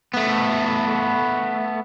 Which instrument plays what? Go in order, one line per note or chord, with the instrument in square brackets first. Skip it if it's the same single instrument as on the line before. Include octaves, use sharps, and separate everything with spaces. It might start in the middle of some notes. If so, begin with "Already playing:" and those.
[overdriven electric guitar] A3 B3